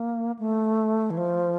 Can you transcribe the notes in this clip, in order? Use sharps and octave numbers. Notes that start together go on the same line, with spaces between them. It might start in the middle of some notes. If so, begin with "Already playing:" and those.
Already playing: A#3
A3
E3
F3